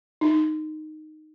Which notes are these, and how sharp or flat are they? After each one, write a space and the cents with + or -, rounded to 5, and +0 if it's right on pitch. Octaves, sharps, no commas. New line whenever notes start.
D#4 -10